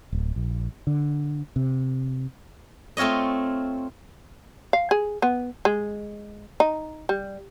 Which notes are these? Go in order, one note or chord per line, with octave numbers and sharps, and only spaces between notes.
D1
A#1
D3
C3
A3 C4 F4 C#5 D#5
F5
G#4
B3
G#3
D#4
G3